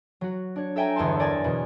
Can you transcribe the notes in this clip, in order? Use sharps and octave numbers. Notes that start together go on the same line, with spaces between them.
F#3 F#4
D4 C#5
A4 E5 G5 G#5 A#5
G1 E2 C#5 A5 C6
A#4 D5 E5 G#5 G#6 A6
E2 B2